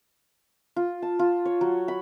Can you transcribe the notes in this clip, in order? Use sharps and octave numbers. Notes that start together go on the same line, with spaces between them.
F4
A5
F4
C#5
F#3
B5